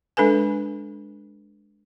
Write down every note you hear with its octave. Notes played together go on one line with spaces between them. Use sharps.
G#3 D4 A4 B4 G#5